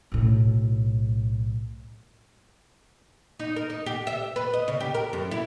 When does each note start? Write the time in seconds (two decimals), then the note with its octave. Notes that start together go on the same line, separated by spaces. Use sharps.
0.12 B1 A2
3.40 D#4
3.56 A#4
3.70 D#4
3.86 G4
4.07 E5
4.36 B4
4.53 D#5
4.68 C#3
4.80 G4
4.94 A#4
5.13 F#2
5.31 E4